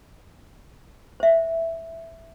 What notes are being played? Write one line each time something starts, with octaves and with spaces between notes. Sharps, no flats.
C5 E5